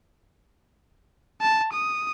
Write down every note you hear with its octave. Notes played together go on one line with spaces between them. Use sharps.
A5
D#6